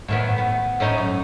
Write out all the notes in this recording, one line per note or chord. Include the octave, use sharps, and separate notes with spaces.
A2 D#3 B3
B3
A2 C#4 D#4
F#2